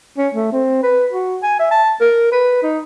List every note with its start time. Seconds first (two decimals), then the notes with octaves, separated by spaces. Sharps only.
0.18 C#4
0.35 A3
0.52 C4
0.83 B4
1.12 F#4
1.42 G#5
1.59 E5
1.71 A5
2.01 A#4
2.32 B4
2.63 D#4